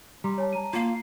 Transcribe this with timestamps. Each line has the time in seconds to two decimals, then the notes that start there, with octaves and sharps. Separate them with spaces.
0.24 G3 A#5 C6 D6
0.38 C#5 G#5 A5
0.53 A5 A#5 D#7
0.73 A#3 F4 F5